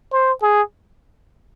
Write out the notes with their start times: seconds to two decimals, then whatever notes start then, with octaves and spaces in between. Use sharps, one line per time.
0.12 C5
0.42 G#4